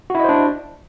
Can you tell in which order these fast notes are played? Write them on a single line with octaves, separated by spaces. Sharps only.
F#4 E4 D#5 C5 D4